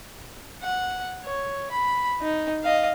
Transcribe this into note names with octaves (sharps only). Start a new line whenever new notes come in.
F#5
C#5
B5
D#4
D#5 F5